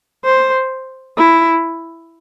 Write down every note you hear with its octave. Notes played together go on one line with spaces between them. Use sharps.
C5
E4